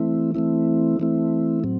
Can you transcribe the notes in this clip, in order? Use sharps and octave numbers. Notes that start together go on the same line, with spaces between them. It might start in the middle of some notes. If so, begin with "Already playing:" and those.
Already playing: E3 A3 C4 E4
E3 A3 C4 E4
E3 A3 C4 E4
A2 F#3 C4